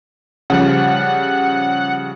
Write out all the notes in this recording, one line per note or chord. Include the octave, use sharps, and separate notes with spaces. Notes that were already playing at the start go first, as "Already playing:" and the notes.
C#3 F3 G3 F#5